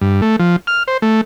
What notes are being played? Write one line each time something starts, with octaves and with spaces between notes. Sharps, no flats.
G2
A3
F3
F6
C5
A3